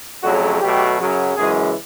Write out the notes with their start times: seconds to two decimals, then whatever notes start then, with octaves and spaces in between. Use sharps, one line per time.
0.23 F2 C#3 F#3 A3 F#4
0.60 B2 F#3 A3 G4
0.98 F#2 C#3 F#3
1.35 F#2 C#3 E3 G#3 G#4